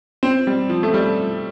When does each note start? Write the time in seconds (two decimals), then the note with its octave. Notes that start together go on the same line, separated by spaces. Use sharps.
0.23 C4
0.47 G3
0.69 F3
0.83 A3
0.94 G3